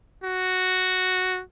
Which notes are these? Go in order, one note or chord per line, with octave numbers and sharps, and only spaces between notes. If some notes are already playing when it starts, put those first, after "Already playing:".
F#4